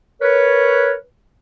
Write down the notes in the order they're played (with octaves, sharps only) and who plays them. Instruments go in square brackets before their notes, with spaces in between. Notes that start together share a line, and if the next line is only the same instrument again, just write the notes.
[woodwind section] A#4 B4 C#5